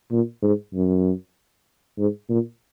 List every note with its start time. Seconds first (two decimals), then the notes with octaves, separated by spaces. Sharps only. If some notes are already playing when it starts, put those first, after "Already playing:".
0.12 A#2
0.42 G#2
0.74 F#2
1.98 G#2
2.29 A#2